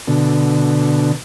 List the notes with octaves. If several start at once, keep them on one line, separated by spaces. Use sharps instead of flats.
B2 D3